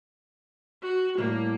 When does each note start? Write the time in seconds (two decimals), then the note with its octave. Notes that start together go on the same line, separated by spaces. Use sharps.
0.82 F#4
1.18 A2 G3 A#3